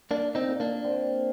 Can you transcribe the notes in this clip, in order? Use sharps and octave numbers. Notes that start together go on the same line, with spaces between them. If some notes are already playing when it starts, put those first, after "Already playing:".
A#2 A#3 D4
C4 D#4
A#2
A#3 D4
C4